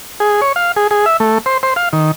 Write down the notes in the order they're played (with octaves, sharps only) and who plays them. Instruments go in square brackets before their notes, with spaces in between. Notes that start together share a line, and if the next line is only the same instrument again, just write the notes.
[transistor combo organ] G#4
C#5
F5
G#4
G#4
E5
A3
C5
C5
F5
D#3